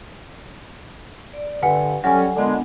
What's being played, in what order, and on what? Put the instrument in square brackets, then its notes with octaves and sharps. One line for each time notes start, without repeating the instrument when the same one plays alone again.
[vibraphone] D5
[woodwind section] G2 D3 [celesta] F#5 G#5 C#7
[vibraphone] F#3 A4 C#6 [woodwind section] G3 C#4 [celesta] F#5 G#5
[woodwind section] A#2 D3 G#3 [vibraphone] B3 D4